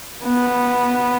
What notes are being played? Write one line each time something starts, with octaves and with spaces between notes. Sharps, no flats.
B3